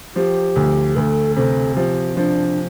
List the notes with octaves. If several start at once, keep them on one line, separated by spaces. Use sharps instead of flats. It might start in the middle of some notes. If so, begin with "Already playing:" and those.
F3 G4
D2
D2 A4 B4
C3 A4
F3 G4
F3 D4